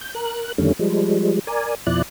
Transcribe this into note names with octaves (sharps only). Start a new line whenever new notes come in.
G6
A#4 F#6
F2 D3 D#3 G3 A3 C#4
F3 G3 G#3
A#4 D5 G#5
F2 B2 F3 E4 D5 F#6